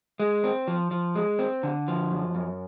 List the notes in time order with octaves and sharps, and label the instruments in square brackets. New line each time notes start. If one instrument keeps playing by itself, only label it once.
[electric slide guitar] G#3
C4
F3
F3
G#3
C4
D3
F3
F#2
F#2